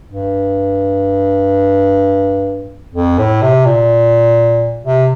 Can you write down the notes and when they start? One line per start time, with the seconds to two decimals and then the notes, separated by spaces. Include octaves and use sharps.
0.10 G2
2.95 F2
3.19 A2
3.42 C3
3.66 A#2
4.84 C3